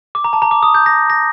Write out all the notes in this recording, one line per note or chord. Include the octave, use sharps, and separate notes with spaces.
D6
A#5
A5
A#5
D6
D#6
G6
A#6
A#6